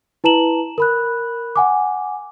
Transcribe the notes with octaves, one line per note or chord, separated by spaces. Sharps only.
E4 B4 A5 A#5 E7 F#7
A#4 B5 F#6
F#5 G#5 D6